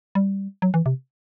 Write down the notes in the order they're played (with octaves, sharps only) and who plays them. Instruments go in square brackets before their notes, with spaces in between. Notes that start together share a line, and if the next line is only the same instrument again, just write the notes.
[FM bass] G3
F#3
E3
C3